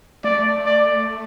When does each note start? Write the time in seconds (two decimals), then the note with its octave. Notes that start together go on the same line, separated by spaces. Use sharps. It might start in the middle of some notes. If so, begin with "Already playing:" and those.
0.24 A3 D5
0.66 D5